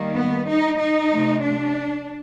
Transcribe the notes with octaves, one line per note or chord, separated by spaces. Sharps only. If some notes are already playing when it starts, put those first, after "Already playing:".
Already playing: D#3 G3 A#3
B3
D#4
D#4
C3 F3 A3
D4